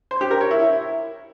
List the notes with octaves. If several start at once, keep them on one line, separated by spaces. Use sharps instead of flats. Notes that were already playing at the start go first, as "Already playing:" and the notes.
C5
G4
A#4
C#5
E4